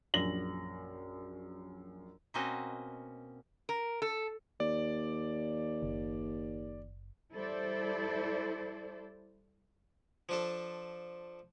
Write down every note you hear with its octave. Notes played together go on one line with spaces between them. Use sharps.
A#1 F#2 A#6 F#7
B2 A#3 C4 C#4 F#4 D#5
A#4
A4
D#2 D5
F#1
G3 E4 A4 C5 D5
F3 D4 A4